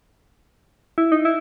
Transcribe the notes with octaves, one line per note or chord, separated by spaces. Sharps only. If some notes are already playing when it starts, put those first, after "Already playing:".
E4
D#4
E4